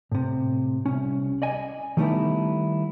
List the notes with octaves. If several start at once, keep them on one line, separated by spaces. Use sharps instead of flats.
A2 C3
C2 C#4
D5 D#5 G#5
D#3 G3 A3 B3 D#4 E4